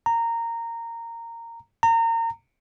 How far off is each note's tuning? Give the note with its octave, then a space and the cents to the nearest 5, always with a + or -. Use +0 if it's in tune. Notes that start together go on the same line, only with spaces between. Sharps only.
A#5 -15
A#5 -30